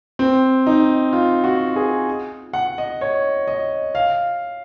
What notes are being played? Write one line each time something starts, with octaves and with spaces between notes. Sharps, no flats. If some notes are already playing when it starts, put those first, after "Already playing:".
C4
D#4
F4
F#4
G#4
F#5
D#5
C#5
D#5
F5